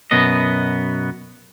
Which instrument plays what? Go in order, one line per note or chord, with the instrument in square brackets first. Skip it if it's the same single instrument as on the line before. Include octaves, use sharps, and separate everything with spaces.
[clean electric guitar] F#2 B2 B3 D#5